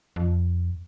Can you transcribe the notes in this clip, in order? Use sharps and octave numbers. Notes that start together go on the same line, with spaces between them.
F2